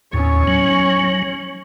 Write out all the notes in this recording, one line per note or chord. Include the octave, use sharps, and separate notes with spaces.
D#2 A2 C#4 C#5
F#3